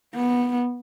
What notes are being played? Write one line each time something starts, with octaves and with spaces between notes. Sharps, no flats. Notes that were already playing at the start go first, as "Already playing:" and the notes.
B3